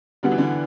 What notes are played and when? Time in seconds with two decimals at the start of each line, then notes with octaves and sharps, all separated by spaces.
0.23 D3 G3 B3 F#4
0.32 E3
0.38 D3